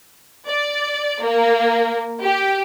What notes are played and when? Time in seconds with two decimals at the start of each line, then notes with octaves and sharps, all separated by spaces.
0.47 D5
1.22 A#3
2.23 G4